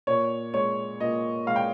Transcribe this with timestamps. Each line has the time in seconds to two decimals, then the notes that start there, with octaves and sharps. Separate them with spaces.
0.07 A#2 C#5
0.54 G#3 C#5
1.00 A#2 D#5
1.47 G#3 F5
1.56 G5